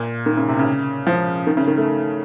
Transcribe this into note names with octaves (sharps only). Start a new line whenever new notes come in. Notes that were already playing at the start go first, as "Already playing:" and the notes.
Already playing: A#2
D#3
C#3
C3
C#3
F3
D#3
C#3
D#3
A3